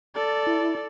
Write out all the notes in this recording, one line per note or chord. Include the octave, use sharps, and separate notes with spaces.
A4 D5
E4